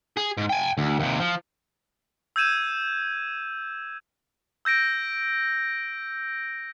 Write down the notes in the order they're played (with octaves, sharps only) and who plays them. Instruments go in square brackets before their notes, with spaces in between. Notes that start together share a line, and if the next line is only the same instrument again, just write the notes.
[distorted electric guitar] G#4
G#2
G5 G#5
D2
D#2 C3
F3
[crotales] E6 G6 G#6 D#7 E7
E6 G6 A#6 D7